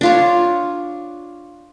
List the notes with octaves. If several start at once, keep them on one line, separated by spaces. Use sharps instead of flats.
D4 F4 C#5